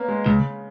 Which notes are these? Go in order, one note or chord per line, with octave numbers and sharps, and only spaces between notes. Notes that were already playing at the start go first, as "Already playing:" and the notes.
Already playing: A#3 B3 C#4
G#3
C#2 C#3